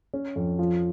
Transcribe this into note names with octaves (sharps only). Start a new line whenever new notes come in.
C#4
F2
F3